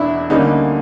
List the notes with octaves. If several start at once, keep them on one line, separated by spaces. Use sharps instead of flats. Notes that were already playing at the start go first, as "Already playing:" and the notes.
Already playing: E2 B2 D4 E4
D2 D3 G3 A#3 C#4 D#4